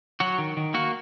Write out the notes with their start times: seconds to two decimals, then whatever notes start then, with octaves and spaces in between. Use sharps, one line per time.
0.20 F#3 F#4
0.38 D#3
0.57 D#3
0.74 A#3 F#4